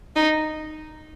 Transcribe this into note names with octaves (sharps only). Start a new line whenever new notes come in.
D#4